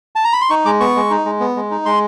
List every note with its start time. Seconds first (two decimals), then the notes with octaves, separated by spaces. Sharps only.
0.16 A5
0.24 A#5
0.33 B5
0.41 C6
0.50 D#4 C#6
0.65 G#3 D6
0.80 B3 C#6
0.96 G#3
1.10 D#4
1.25 G#3
1.40 B3
1.56 G#3
1.71 D#4
1.86 G#3 C6